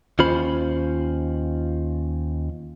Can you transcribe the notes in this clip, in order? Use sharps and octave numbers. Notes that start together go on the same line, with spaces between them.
D#2 C#4 F4 C5 B5